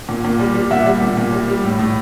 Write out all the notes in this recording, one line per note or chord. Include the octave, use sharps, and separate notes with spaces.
A#2
A#2
G3
G3
A#2 E5 F#5
G3
A#2
A#2
G3
G3
A2
A2